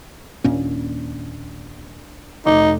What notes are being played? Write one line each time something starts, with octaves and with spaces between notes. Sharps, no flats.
D#2 A#2 C#4 D4
F1 D#4 D6